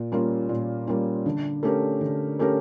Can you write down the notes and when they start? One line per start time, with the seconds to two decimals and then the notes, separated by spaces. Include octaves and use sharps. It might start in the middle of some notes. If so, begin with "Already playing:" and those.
Already playing: A#2
0.12 G3 A#3 C#4 F4
0.49 A#2
0.87 G3 A#3 C#4 F4
1.26 D3
1.63 A3 C#4 G4 A#4
2.01 D3
2.39 A3 C#4 G4 A#4